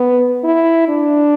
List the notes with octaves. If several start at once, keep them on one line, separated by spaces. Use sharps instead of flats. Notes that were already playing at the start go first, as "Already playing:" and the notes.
Already playing: B3
E4
D4